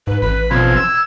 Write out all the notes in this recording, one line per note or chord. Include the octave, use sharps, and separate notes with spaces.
G#2 B4
A1 B4 B5
B2 F3 C4 G#6
E6